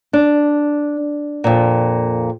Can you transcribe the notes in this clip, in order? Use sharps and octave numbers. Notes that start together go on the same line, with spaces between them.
D4
F2 A#2